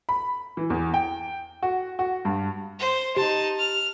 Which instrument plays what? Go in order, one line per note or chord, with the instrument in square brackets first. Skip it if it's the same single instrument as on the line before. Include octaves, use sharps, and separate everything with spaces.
[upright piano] B5
E3
E2
G5
F#4
F#4
G2
[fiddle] C5
[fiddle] D#4 A5 [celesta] G4
[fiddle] F6